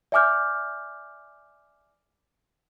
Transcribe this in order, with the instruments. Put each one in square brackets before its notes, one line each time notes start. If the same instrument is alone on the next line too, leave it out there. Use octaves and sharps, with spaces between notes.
[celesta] D5 E5 G#5 D6 F6 G6